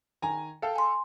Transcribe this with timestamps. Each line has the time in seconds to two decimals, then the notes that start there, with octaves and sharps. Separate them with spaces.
0.22 D#3 G#5 A#5
0.62 A4 F5 G5
0.76 G#5 C6